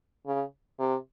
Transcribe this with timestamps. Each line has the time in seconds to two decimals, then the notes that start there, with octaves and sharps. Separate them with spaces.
0.27 C#3
0.79 C3